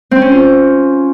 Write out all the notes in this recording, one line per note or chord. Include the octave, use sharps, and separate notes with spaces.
C4
C#4
F4